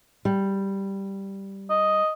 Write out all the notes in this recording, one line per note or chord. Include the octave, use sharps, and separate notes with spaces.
G3
D#5